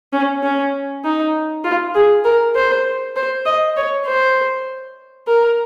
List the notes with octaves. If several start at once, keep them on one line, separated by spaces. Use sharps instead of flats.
C#4
C#4
D#4
F4
G#4
A#4
C5
C5
D#5
C#5
C5
A#4